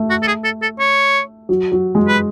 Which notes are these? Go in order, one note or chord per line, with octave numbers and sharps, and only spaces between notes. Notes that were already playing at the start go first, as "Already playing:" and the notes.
Already playing: A3
F#4
A4
G#4
A4
A4
C#5
F#3
F#3
G#3
B4